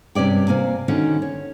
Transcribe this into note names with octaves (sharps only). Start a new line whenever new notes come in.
G2 C3 C#4 D5 G5
C3 A#3 G#5
D3 D#3 C#4 F#4
C#5